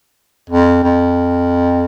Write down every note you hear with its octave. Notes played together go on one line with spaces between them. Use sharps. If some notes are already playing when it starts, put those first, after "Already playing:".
F2
F2